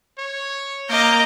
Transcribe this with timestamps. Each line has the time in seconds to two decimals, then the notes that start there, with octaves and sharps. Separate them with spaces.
0.18 C#5
0.89 A#3 A#4 D#5 A#5 D6 G6